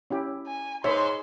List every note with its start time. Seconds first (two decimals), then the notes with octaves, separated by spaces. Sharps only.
0.10 C#4 E4 G4
0.47 G#5
0.84 G#2 B4 C#5 E5 C6